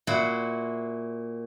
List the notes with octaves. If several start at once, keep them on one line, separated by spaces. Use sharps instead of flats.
A#2 E4 F#4 C5 F#5